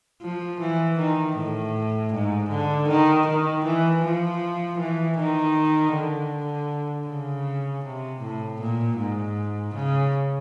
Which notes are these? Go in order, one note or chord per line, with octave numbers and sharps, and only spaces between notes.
F3
E3
D#3
A2
G#2
D3
D#3
D#3
E3
F3
E3
D#3
D3
C#3
C3
A2
A#2
G#2
C#3